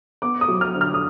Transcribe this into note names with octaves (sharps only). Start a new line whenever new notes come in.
B3 D6
D#6
F#3
F6
D3
F6
D#6